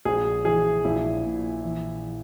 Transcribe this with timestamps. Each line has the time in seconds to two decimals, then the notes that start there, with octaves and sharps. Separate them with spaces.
0.05 A#1 G#4
0.45 E3 G#4
0.85 A#1 E4
1.25 A#2
1.64 E3